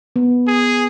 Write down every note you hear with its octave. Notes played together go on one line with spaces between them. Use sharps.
B3
G#4